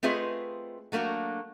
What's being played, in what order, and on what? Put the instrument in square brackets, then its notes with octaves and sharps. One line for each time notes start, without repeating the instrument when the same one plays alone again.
[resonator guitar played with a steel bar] A3 C4 F4 G#4 B4 D#5
F#3 A3 A#3 D4 F#4